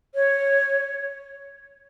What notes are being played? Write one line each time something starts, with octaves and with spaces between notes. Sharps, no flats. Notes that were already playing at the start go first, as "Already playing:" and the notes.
C#5